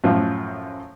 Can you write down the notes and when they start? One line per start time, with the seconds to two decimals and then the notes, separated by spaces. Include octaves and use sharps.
0.04 F#2 A2 F3